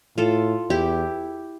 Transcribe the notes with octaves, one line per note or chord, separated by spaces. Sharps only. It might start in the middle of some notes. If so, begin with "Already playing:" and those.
A2 F4 A4
E2 E4 G4